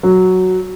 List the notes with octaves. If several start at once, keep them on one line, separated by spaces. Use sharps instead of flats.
F#3